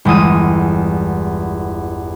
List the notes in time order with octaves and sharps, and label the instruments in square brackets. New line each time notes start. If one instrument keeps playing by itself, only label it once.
[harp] G1 E2 G#3 D#6 E6